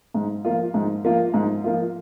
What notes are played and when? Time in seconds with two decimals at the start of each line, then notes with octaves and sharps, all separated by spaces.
0.14 G#2
0.45 F3 A#3 F4
0.74 G#2
1.04 F3 A#3 F4
1.34 G#2
1.64 F3 A#3 F4